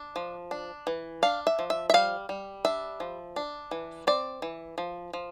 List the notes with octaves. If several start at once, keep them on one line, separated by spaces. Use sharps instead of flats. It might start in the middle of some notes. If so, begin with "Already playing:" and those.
Already playing: D4
F3
D4
E3
D4 F5
E5
F3
E5
E5
G3 F5
G3
D4 E5
F3
D4
E3
C4 D5
E3
F3
F3